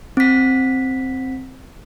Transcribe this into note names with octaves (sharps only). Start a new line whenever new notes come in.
C4 B6